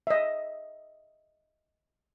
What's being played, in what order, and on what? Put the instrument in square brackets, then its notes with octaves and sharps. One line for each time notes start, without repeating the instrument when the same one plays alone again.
[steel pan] D#5 E5